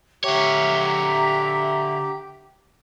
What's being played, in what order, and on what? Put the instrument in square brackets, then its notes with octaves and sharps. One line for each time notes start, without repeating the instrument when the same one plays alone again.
[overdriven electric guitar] D3 C#5 [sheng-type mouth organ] G4 [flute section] E5 A#5